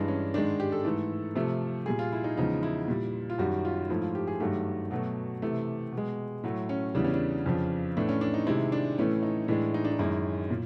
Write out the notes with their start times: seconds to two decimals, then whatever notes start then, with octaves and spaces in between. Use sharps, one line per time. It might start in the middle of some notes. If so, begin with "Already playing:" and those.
Already playing: G2 E3 G#3 D4
0.08 C#4
0.34 G#2 D#3 G#3 D4
0.60 G4
0.72 A4
0.84 G#2 E3 A3
1.36 C3 F3 A3
1.86 A#2 G3 G#4
1.99 F4
2.12 E4
2.24 D#4
2.37 E2 C#3 F3 G#3 D#4
2.63 E4
2.88 A#2 G3
3.30 F4
3.38 F#2 D#3 G3 F#4
3.65 F4
3.89 G#2 F3 A3 E4
4.02 F4
4.15 G4
4.28 G#4
4.40 G2 D#3 F#3 A3 G4
4.91 B2 F#3 A3
5.42 C3 E3 A3
5.92 B2
5.98 G#3
6.43 A2 F#3 A3
6.69 C#4
6.95 E2 C#3 E3 G3 D4
7.04 C#4
7.14 D4
7.46 F2 C#3 F3
7.97 A2 E3 A3 D4
8.09 C#4
8.21 D4
8.34 D#4
8.47 C3 D#3 G#3 E4
8.72 D4
8.98 A2 E3 A3 C#4
9.23 D#4
9.48 A2 E3 G#3 D4
9.74 D#4
9.85 D4
9.92 D#4
9.99 F#2 D#3 G#3 E4
10.50 A#2